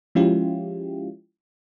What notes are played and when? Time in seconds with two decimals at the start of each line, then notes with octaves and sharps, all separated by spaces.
0.15 F3 G#3 C#4 E4 F4 G4